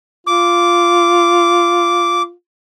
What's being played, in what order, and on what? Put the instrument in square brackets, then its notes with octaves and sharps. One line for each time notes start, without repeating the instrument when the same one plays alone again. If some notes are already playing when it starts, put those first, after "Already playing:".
[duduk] F4 [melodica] D6